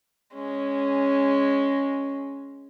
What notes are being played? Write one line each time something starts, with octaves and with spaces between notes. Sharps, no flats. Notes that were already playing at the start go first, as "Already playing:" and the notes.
G#3 C#4